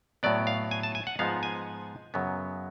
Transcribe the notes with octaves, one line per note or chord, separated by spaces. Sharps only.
A2 F#3 B3 D5
F5
G#5
A5
G#5
F#5
G#2 F3 G#3 B3 F5
G#5
F#2 C#3 F#3 B3